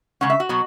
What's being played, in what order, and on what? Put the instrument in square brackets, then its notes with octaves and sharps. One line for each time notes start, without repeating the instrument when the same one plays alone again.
[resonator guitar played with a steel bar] C#3 G#3 C#4 F#5
E5
F#4
B2 F#3 B3